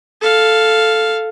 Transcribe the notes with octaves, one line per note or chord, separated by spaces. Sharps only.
A4 F5